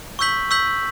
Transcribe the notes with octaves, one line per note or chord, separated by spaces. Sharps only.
C#6 E6 G6 B6 F#7
C#6 E6 G6 B6 F#7